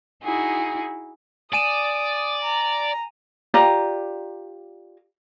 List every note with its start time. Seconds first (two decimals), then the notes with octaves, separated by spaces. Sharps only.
0.21 D#4 E4 F#4 G#4
1.53 D5 G#5 D#6 D#7 E7
2.43 A#5
3.54 F4 G4 D5 A#5